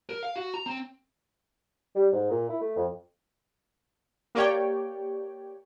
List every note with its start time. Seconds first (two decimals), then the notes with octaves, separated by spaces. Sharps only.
0.09 A#4
0.23 F5
0.36 F#4
0.54 A#5
0.66 C4
1.95 G3
2.12 G#2
2.30 A#2
2.49 E4
2.61 A3
2.76 F2
4.35 A#3 G4 C#5 D5 G5